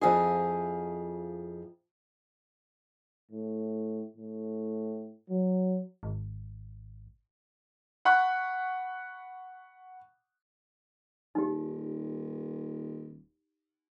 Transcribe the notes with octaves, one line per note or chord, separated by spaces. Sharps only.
F2 F3 E4 G#4
A2
A2
F#3
G#1
F#5 B5 C#6 F#6
D#1 D#4 G4